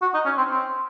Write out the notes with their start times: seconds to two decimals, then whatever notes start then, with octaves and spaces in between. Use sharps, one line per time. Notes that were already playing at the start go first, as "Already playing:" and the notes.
0.02 F#4
0.14 D#4
0.25 C#4
0.37 C4
0.50 C4